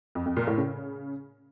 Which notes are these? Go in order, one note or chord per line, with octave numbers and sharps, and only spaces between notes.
F2
F2
A#2
A2
C#3